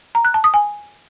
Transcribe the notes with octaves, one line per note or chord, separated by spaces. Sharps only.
A#5
F#6
A5
D#6
G#5